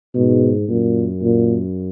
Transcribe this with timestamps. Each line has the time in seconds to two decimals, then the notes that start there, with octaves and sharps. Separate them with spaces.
0.15 G#2 B2
0.68 F#2 A#2
1.22 A#2